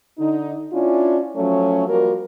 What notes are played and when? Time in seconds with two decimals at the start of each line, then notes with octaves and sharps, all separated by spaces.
0.19 D3 D#4
0.72 C#4 D4 E4 F4
1.37 F3 F#3 A3 C#4
1.88 F3 G3 A#3 F#4 A#4